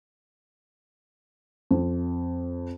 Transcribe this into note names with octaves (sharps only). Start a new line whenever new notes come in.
F2